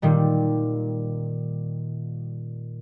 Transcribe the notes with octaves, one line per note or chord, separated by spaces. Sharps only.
A#2 D#3 G3